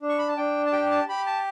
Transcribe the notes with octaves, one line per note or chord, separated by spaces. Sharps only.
D4
C#6
B5
A5
D4 G5
A5
G4 G5
A5
G4 B5
A5